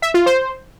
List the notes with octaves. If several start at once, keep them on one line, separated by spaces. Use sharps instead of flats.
E5
F4
C5